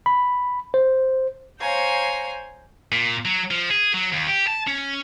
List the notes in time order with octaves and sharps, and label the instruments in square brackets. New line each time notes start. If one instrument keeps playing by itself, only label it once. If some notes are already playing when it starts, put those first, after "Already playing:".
[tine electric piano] B5
C5
[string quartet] C5 C#5 F5 G5 G#5 A#5
[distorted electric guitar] A#2
F#3
F3
G#4
F#3
D#2
G4
A5
C#4